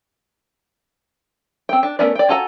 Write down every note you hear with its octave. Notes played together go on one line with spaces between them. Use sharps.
C4 G5
D4
A3 B3 C#4 A#4 D5
D5 G5
F4 F#4 A4 G#5 A#5